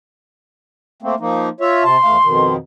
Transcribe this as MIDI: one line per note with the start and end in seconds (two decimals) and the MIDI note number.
1.02 1.15 57
1.02 1.15 58
1.02 1.15 60
1.20 1.49 53
1.20 1.49 58
1.20 1.49 63
1.60 1.84 65
1.60 1.84 73
1.60 1.84 76
1.84 1.97 48
1.84 1.97 81
1.84 2.53 84
2.04 2.17 40
2.04 2.17 57
2.04 2.17 77
2.24 2.56 41
2.24 2.56 47
2.24 2.56 51